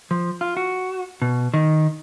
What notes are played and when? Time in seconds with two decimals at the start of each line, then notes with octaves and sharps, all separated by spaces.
0.11 F3
0.41 F4
0.57 F#4
1.22 B2
1.54 D#3